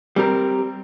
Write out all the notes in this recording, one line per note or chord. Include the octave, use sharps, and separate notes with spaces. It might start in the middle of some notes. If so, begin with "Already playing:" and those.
G3 C4 A#4